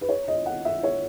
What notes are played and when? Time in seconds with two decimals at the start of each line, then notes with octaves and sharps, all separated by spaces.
0.01 B4
0.09 C#5
0.28 D#5
0.46 F#5
0.65 E5
0.83 C#5